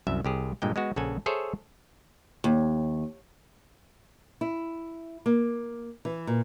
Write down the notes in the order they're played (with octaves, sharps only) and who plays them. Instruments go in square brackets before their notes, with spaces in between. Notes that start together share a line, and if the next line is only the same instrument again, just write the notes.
[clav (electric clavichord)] C2 F#2 E5
C2 G4 G#4
G2 A#2 G#3 G5
G#3 B3 F#4
A#1 C#3 A4 F#5 G#5
G#4 A4 C5 C#5 E5
[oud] D#2
[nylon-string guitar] E4
A#3
E3
A#2